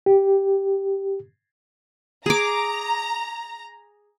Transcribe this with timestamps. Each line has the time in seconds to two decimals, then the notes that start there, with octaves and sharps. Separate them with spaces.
0.06 G4
2.26 G#4 A#5 D6